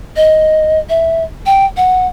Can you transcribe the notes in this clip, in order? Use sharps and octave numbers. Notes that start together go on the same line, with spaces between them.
D#5
E5
G5
F#5